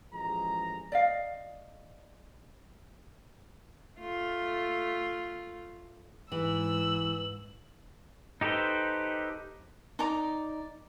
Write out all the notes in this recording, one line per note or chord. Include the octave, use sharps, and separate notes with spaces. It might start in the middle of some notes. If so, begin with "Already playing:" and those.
A1 F3 G#3 G#4 A#5
D5 D#5 F5
A3 F4
G#2 E3 E6 F#7
D#4 G4 A4 B4 C5
D#4 D5 A#5 D6